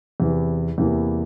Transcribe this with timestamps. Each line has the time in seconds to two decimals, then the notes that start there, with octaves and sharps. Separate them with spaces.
0.20 E2 C3 E3
0.78 E2 C3 E3 A#3